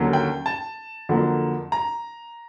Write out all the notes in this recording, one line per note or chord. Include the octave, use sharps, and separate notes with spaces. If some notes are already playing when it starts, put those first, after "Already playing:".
Already playing: D#2 D3 F#3 A#3 C#4
G5
A5
F2 D3 F#3 A#3
A#5